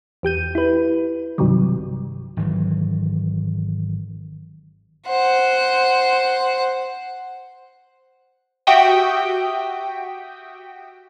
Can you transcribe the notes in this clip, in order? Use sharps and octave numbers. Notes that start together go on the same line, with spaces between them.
E2 G4 G6 D#7
E4 B4
B1 G2 C3 D#3 F#3 G3
G#1 D#3 E3 F#3
C5 F#5
F#4 G4 E5 G5 D#6